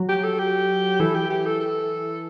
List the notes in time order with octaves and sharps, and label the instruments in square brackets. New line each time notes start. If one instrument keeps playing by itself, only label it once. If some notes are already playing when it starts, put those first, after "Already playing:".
Already playing: [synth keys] F#3
[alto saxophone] G4
A4
G4
[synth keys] E3 [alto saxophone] A4
[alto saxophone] G4
G4
A4
A4